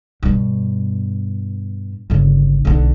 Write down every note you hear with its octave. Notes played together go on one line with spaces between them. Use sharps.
G2 B2
G1 C#3
B1 D3